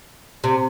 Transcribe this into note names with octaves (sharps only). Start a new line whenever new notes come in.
C3